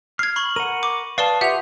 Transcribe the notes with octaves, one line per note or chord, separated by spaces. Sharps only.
F6 G#6 C7
B5 C#6 F#7
A#4 F#5 D#7
C#6 D6
B4 D5 F5 A5 D#6 G7
F4 G4 B4 E5 F#5 G6 F7